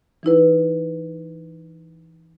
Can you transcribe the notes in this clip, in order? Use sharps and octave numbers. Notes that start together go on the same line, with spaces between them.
E3 D#4 E4 B4